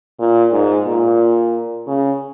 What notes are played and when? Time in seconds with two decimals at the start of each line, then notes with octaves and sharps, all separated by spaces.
0.19 A#2
0.52 G#2
0.86 A#2
1.87 C#3